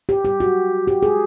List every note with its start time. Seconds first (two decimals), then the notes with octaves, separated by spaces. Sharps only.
0.09 G4
0.25 G4
0.40 F#4
0.88 G4
1.03 G#4